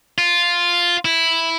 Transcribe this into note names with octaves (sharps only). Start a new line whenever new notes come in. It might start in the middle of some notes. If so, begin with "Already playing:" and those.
F4
E4